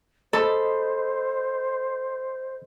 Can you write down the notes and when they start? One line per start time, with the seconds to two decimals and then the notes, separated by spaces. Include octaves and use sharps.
0.33 A4 C5 D#5 B5